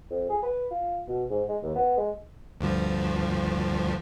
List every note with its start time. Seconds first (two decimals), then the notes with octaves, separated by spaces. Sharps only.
0.10 F2
0.29 G#4
0.43 B4
0.71 F4
1.08 B2
1.30 G#2
1.49 G#3
1.63 D#2
1.76 B3
1.97 G#3
2.61 D2 G2 F3